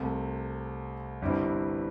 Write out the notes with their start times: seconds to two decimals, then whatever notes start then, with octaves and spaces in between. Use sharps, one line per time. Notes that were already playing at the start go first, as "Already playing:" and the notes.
Already playing: C2 C3 A3
1.22 G1 G2 G3 C4 E4